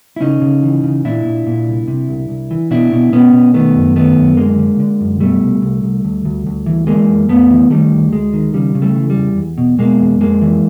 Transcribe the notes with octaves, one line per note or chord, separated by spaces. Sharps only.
E4
C#3 C#4 D#4
C#3
E3
C#3
A#2 D4 E4
A#2
A#2
C2
C3
C2
C2
E3
B2 D4 E4
B2
B2 B3 C#4
B2
D#3 A3 B3
F#2
D#3 A3 B3
F#2
D3 G#3 A#3
D3
D3
F#2
B2 G3 A3
C2
C2
C2
D2
D2
D2
E3
E3 G#3 A#3
F2
F2 A3 B3
E3
D#3 G3 A3
D2
D2 G#3
D#3
C#3 G3
C#3
G3 A3
E3
G3
E2
E2
B2
B2 G#3 A#3
E2
F2 G#3 A#3
E3